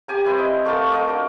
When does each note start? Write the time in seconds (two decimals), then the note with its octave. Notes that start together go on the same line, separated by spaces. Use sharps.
0.08 G4 G#5 A#5
0.25 C4 E4 B4 D5
0.38 D#5
0.65 A3 A#3 A#4 A5
0.92 A#3 A#4 D#5 D6
1.08 D4 F#4